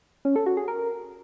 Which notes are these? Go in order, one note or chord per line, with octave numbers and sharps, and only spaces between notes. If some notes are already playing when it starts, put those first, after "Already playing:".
C#4
A4
F#4
G#4
A#4